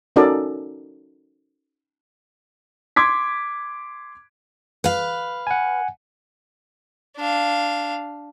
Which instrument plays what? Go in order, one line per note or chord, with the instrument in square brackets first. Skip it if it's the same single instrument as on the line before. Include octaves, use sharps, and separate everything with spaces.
[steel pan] C#4 D#4 F#4 A4 A#4 D5
[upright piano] C6 D6 G#6 B6
[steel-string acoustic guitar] B4 F5
[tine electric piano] F#5 G#5
[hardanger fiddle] D4 F5